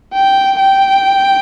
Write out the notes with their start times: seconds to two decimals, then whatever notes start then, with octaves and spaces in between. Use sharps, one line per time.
0.14 G5
0.59 G5